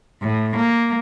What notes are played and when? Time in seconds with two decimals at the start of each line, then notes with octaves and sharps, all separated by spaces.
0.22 A2
0.56 A#3